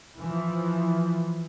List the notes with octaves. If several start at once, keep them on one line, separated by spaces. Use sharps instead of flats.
E3 F3